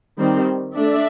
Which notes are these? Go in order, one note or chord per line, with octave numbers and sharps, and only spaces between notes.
D#3 G3 C4
A3 D4 D5 E5